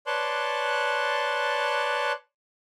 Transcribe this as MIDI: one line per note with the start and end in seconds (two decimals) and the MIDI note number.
0.07 2.12 71
0.07 2.12 73
0.07 2.12 74
0.07 2.12 81
0.07 2.12 84
0.07 2.12 90